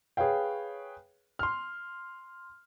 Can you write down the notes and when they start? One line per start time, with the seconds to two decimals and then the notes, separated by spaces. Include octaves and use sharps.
0.17 G#4 B4 C#5 F5 G5
1.39 C6 F6